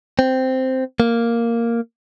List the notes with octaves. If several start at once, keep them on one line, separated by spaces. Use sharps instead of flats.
C4
A#3